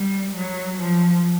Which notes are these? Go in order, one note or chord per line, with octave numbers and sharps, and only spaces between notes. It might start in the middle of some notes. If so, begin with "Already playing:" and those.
Already playing: G3
F#3
F3